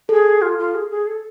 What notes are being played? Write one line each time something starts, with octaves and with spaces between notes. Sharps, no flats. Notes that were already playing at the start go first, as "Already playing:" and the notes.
G#4 A4
F4
F4
G#4
G#4
A4